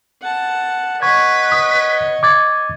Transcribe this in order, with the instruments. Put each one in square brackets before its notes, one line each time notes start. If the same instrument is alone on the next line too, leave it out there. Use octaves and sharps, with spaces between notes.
[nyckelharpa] F#5 A5
[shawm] B4 [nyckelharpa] C#5 D#5 [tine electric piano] F#5 C#6 G#6
[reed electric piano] D#6
D6 G#6 A6